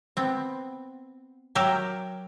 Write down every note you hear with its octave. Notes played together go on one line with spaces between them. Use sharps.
B3 C4
F#3 G4 A#4 E5